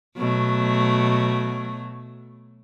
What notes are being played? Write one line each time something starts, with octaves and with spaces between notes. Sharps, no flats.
B2 F#3 A3